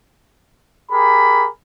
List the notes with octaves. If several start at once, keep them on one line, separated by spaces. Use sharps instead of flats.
G4 G#4 A#4 B5